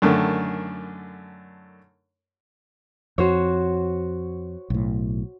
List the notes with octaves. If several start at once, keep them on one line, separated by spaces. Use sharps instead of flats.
F#2 D3 D#3 A3
F2 F#4 C5 C#5
B1 A2